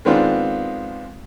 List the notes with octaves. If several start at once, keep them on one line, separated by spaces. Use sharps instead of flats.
D#3 G#3 B3 C4 D4 F4